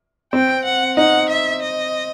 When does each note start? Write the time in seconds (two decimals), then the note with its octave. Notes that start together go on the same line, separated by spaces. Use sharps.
0.33 C4 G5
0.65 F#5
0.97 D#4 F#5
1.29 E5
1.62 D#5